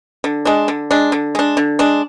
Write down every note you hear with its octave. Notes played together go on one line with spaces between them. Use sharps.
D3
G#3 D4
D3
G#3 D4
D3
G#3 D4
D3
G#3 D4